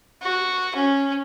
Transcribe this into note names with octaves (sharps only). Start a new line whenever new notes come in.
F#4
C#4